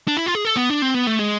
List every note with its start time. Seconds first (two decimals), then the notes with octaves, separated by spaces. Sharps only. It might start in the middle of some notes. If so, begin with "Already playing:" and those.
0.08 D4
0.17 E4
0.26 F4
0.35 G#4
0.45 A4
0.57 B3
0.70 D4
0.82 C4
0.94 B3
1.07 A3
1.19 G#3